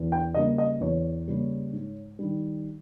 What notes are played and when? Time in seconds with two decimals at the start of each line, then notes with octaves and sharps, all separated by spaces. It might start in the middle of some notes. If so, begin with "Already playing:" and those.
Already playing: E2
0.12 G5
0.34 C#3 G3 A#3 D#5
0.58 D#5
0.80 E2 C#5
1.27 C#3 G3 A#3
1.72 G#2
2.19 D#3 G3